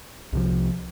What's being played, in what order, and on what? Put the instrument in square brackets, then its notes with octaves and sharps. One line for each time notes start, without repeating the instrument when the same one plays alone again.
[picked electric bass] C2 C3 F3